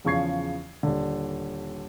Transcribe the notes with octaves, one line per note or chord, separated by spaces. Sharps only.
E2 C#3 F3 C#6 G#6 C7
D#1 D3